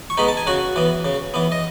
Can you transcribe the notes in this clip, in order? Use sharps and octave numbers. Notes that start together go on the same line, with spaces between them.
C#6
G#3 B3 D#4 B5
A5
G#5
C#3 F#4 F#5
E3 B3
C#3
E3 B3
D#5